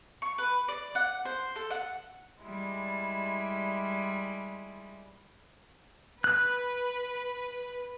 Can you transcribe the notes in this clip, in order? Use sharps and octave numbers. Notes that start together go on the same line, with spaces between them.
C#6
B4
D5
F#5
C5
A4
F#5
G3 G#3 E4
B4 F#6